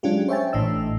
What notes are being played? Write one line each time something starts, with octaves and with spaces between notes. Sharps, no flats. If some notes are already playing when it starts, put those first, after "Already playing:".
F#3 G#3 C#4 D4 F4 G4
C5 C#5 E5 G5 G#5 A6
A1 A2 E3 D4 D#5 E6